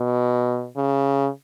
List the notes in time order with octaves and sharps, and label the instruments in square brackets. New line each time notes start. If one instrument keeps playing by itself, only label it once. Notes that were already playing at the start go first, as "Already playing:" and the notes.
Already playing: [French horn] B2
C#3